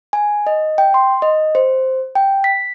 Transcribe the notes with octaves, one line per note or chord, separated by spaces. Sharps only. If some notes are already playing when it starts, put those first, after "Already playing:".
G#5
D#5
G5
C6
D#5
C5
G5
B6